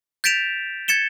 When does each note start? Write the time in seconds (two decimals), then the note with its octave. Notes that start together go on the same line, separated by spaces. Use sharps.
0.24 G6 A6 B6 D7 E7 F7
0.88 G#6 A6 C#7 E7 G7